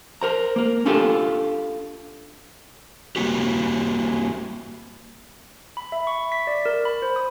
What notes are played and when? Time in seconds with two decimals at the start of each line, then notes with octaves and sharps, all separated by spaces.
0.21 A#4 C5 A#5
0.56 A#3 A#4
0.85 C#4 D4 F4 G4 A4
3.16 G3 A#3 F#4 G4
5.77 B5
5.92 E5
6.07 C#6
6.32 B6
6.47 D5
6.66 A#4
6.85 B5
7.02 C5
7.16 D#6